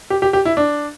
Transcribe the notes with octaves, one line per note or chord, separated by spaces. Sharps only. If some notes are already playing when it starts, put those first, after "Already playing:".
G4
G4
G4
E4
D4